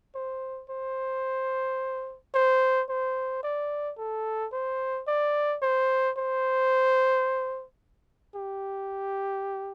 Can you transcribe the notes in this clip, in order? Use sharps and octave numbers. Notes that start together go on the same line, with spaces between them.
C5
C5
C5
C5
D5
A4
C5
D5
C5
C5
G4